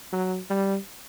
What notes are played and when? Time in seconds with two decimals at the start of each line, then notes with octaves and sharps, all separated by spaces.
0.13 F#3
0.50 G3